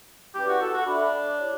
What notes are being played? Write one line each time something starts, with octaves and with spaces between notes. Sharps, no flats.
C#4 E4 G4 B4 D5
F#4
A4
F#4
D4 A4 E5 B5
E4 G4 C#5